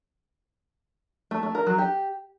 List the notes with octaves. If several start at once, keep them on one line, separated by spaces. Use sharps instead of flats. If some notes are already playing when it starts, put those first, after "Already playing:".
A3
A3
A#4
F#3
G4